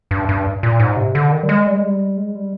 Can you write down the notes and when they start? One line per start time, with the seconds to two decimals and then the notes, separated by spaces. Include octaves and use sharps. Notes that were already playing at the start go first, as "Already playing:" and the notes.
0.11 G2
0.29 G2
0.63 A#2
0.80 G#2
0.97 C3
1.15 D3
1.32 D#3
1.43 G3
1.49 G#3
1.67 G3
1.74 G#3
1.83 G3
2.17 G#3
2.35 G3